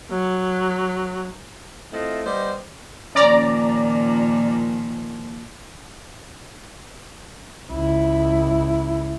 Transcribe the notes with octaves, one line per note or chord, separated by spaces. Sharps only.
F#3
A3 C4 E4 F4 D#5
G3 B3 C5 D#5
A#2 D#3 F3 C#4 D5 A#5
C#2 E4